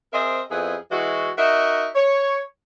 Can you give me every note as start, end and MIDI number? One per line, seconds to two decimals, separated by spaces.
0.13 0.41 60
0.13 0.41 68
0.13 0.41 70
0.13 0.41 72
0.13 0.41 75
0.13 0.41 76
0.50 0.75 41
0.50 0.75 59
0.50 0.75 64
0.50 0.75 68
0.91 1.30 52
0.91 1.30 56
0.91 1.30 64
0.91 1.30 66
1.37 1.88 63
1.37 1.88 66
1.37 1.88 70
1.37 1.88 76
1.95 2.40 73